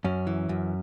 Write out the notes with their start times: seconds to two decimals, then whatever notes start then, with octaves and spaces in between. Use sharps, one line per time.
0.04 F#2 C#4
0.27 E3
0.49 F#2